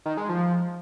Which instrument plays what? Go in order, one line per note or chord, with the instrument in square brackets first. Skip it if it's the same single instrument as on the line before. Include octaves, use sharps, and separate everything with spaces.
[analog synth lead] D#3
G#3
F3